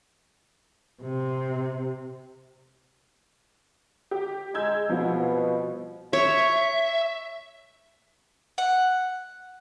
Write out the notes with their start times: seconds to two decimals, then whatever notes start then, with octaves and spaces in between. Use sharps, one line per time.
1.03 C3
4.11 G4
4.55 G#3 E6 G6 G#6
4.89 C2 B2 F3 B3 F4
6.13 C#5 E5
8.58 F#5